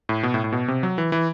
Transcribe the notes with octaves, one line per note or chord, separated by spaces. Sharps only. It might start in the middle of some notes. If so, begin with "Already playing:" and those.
A2
B2
A2
A2
B2
C3
F#3
E3
E3